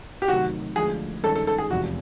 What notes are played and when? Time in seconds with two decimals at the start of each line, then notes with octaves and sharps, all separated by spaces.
0.22 G4
0.28 D2 C3 D#3 F#3 F#4
0.76 D2 D3 F3 G#3 G#4
1.23 G2 D#3 G#3 C#4 A4
1.35 A4
1.47 A4
1.58 G#4
1.71 F1 E2 C3 F3 G#3 F#4